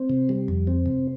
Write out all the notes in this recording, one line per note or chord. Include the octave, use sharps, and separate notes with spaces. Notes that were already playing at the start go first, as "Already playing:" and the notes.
Already playing: C4
C3
G3
F2
C4
C3